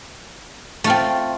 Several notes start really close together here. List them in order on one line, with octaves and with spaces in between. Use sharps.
A3 F4 C4